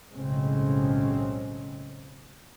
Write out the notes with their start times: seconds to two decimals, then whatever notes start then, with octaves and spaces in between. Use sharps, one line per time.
0.12 B1 A2 C#3 G#3 C4 C#4